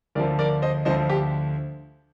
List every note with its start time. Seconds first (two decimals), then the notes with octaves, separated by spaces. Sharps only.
0.15 D2 D3 F3 A#4 D5
0.39 A#4 D5
0.62 C5 D#5
0.85 D2 D3 F3 C5 D#5
1.10 G4